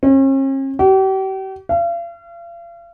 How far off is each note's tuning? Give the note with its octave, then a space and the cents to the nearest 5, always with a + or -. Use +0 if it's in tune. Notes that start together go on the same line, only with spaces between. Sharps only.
C#4 -45
G4 -40
F5 -40